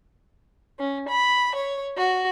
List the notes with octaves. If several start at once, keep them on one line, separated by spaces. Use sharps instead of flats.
C#4
B5
C#5
F#4